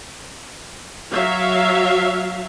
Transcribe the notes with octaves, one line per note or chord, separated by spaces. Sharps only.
F#3 E5 F5